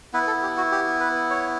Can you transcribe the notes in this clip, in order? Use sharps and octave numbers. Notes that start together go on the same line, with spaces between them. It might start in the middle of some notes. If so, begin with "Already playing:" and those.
B3 E4 B4
A4
G4
F#4
G4
B4
C#5